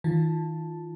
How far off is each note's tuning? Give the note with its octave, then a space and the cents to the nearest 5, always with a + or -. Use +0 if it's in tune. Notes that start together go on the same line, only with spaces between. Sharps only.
D#3 +35 F4 +0 A5 +0